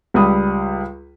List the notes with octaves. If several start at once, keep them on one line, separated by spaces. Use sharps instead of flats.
C#2 G3 B5 D#6